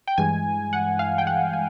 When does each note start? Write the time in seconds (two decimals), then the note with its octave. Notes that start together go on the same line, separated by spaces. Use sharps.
0.07 G5
0.18 G2 E3 G#3 G#5
0.73 F#5
0.99 F5
1.18 G5
1.27 F#5
1.53 G#5